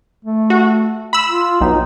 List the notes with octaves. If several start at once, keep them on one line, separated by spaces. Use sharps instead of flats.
A3
F#4
B5 E6
F4
B1 D#4